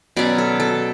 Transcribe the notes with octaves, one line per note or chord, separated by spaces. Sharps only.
B2 F#3 C#4 D5
A4
A4